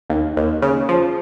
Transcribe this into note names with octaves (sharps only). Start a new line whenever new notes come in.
D#2
D#2
C#3
F3